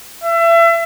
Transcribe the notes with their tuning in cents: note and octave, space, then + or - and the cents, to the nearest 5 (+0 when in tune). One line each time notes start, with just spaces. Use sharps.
E5 +30